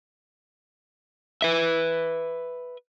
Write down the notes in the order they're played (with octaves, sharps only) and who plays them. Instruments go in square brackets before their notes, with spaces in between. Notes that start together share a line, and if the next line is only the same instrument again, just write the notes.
[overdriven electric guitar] B4 E5